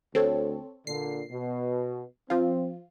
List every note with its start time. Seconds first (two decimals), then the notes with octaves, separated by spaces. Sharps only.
0.15 D2 C4 A4 C#5
0.87 A#2 D3 C7
1.31 B2
2.30 F3 C4 F4